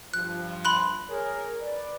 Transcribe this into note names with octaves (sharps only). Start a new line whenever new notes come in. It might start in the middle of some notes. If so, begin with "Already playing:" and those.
G2 F3 F#6
B5 C6 F#6
G#4 A#4 C#5
B4 D5